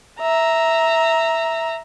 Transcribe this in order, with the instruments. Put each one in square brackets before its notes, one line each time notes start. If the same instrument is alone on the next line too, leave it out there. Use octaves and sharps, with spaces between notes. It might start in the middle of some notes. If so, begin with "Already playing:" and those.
[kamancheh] E5 A#5